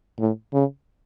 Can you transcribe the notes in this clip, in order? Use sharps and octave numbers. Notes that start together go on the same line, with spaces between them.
A2
C#3